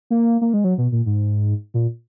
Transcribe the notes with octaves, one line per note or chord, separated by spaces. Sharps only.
A#3
A#3
G#3
F#3
B2
A#2
G#2
A#2